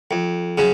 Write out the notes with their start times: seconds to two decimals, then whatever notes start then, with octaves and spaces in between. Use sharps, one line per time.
0.11 F2
0.58 C#3 F#3